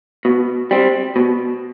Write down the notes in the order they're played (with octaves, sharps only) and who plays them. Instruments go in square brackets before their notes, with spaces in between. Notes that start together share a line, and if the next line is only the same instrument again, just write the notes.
[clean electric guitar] B2
G3 C4
B2